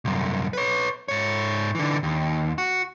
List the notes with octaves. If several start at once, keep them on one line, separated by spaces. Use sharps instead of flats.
C2 F#2
B4 C#5
G#2 C#5
D3 E3
D#2
F#4